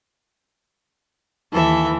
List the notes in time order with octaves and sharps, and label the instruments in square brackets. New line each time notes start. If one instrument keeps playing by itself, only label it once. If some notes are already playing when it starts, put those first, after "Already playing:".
[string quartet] D#2 E3 [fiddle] A4 E5